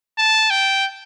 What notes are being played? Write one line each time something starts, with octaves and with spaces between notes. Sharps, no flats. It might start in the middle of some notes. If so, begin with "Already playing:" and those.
A5
G5